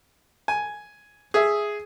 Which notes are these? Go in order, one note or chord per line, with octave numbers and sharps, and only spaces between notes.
G#5
G#4 E5